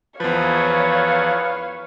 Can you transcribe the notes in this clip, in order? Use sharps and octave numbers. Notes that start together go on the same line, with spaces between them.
E2 F3 B4 C#5 F5